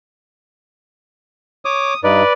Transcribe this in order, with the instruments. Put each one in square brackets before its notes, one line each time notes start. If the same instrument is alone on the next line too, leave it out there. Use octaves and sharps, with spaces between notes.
[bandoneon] C#5 D6 [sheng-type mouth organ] D#6
[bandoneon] G2 D#4 [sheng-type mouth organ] B4 D5